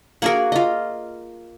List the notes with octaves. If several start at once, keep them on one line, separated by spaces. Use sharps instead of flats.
A#3 F#4 G#4 A#4 F#5
F4 D#5